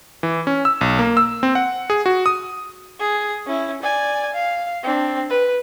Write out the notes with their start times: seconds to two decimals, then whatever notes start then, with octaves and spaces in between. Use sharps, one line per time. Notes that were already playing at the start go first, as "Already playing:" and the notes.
0.23 E3
0.47 C#4
0.65 E6
0.81 B1
0.99 A#3
1.17 E6
1.43 C4
1.55 F#5
1.90 G#4
2.06 F#4
2.26 D#6
3.00 G#4
3.47 C#4 E4
3.82 D5 G#5
4.33 F5
4.83 C4 D4
5.30 B4